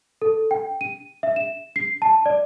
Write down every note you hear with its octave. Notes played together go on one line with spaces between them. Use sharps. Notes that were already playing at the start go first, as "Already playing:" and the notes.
A4
G5
D#7
E5
E7
C7
A5
D5